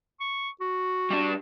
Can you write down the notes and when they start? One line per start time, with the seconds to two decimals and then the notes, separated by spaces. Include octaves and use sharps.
0.20 C#6
0.61 F#4
1.10 G3 D4